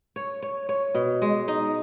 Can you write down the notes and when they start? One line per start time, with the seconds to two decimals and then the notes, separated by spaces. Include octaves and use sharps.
0.16 C#5
0.42 C#5
0.69 C#5
0.95 B2
1.22 G#3
1.48 D#4